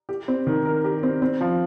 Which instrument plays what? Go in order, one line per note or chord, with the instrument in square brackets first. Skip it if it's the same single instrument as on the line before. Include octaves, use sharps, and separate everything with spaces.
[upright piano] G4
C4
D#3
A#4
G4
C4
C4
F3